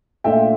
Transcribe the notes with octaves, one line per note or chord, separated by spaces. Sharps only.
A#2 A3 D4 F4 E5 G5